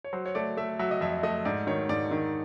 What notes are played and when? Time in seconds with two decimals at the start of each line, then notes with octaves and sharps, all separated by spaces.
0.04 C#5
0.13 F#3 C5
0.26 C#5
0.35 A3 D5
0.57 A3 E5
0.79 F#3 E5
0.91 D#5
1.01 F2 E5
1.23 A3 D#5
1.45 G#2 D5
1.67 D#3 C#5
1.89 G#2 D5
2.11 D#3